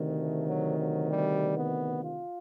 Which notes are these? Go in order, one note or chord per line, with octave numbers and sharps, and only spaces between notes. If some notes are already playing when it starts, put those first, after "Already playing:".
Already playing: D2 C3 D#3
A3
F#3
F#3
G3
B3
F4